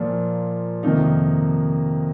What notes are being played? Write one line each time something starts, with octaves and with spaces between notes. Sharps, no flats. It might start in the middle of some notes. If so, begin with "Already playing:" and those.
Already playing: A#2 F3 A#3
F2 C3 D#3 A#3 D#4